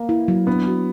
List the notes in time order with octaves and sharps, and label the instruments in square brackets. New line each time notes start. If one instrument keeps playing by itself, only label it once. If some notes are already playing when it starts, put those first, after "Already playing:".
Already playing: [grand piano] A#3
[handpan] E4
F#3
[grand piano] B3 [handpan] D4
[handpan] F#4